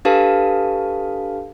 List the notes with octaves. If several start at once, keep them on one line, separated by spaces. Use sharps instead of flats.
D4 G4 A4 B4 F5 A5